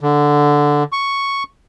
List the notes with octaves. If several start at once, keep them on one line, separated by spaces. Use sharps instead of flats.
D3
C#6